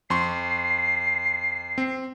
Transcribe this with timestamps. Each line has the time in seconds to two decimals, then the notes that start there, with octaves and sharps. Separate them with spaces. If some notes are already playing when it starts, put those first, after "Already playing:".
0.10 F2 C6 C#6 C7
1.78 C4